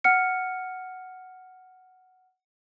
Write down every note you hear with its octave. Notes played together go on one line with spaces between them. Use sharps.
F#5 F6 C#7